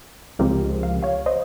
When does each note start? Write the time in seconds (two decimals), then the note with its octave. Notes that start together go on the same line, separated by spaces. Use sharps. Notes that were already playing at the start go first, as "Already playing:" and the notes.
0.39 C#2 C3 F3 G#3 C4 G4 A#4
0.83 F5
1.03 C#5 F5
1.26 C5 D#5